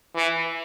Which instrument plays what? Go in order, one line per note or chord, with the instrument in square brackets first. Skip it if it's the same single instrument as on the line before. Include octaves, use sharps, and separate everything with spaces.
[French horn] E3